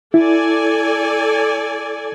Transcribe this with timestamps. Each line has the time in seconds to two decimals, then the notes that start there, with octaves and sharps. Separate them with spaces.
0.14 E4 A4 D5 G#5